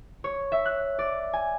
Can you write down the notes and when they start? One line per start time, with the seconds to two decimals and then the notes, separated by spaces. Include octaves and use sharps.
0.24 C#5
0.52 E5
0.65 F#6
0.99 D5
1.33 G#5